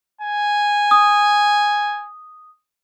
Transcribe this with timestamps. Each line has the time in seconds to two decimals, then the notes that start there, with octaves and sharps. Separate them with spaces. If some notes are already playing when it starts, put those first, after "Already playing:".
0.21 G#5
0.91 D#6